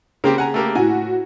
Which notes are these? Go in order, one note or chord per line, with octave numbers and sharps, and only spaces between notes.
C#3 A#3 C4 G4
F#5 G#5 A#5
A3 A#3 G4
A2 F#4 G#5